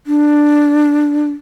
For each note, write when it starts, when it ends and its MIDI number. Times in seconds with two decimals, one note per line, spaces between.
0.07 1.30 62